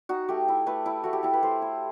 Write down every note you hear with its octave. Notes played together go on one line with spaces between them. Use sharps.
D#4 F#4
A3 G4
E4
A3 B4
E4
A3 F#4
G4
E4 A4
B4
A3 C5
E4